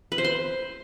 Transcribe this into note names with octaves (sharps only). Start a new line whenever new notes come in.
B4
C5
C6